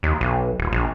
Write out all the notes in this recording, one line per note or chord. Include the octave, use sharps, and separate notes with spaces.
D#2
B1
D#1
A#1